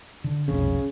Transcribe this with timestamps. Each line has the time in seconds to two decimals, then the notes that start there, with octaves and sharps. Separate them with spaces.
0.24 D3
0.48 F1 B1 F2 C#3